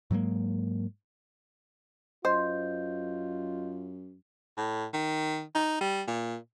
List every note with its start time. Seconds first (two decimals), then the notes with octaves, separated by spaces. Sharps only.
0.11 G#2 F#3 G#3 A#3
2.25 F#2 F4 C5 D#5 G6
4.58 A2
4.94 D#3
5.55 D#4
5.81 G3
6.08 A#2